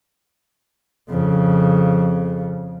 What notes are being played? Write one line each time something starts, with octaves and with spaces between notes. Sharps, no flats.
F2 C#3